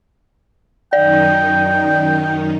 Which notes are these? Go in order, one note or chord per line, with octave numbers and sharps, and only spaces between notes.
F#2 D#3 D#4 D5 G5